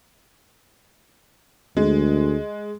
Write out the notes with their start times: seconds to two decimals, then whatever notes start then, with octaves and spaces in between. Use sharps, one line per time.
1.77 D2 G#3